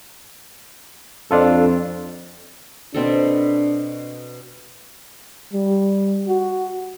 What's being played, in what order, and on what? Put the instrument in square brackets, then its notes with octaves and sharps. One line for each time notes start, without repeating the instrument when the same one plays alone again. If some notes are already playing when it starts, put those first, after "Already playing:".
[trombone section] F2 [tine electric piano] D4 F4 A4
[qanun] B2 C4 A4 [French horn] D4
[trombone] G3
F#4